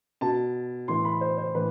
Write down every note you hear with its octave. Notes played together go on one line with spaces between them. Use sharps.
B2 A5
A2 E3 C6
B5
C5
C5
A2 E3 B4